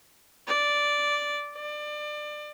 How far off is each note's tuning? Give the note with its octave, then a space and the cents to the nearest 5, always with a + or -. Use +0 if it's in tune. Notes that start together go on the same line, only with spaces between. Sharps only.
D5 -5
D5 +25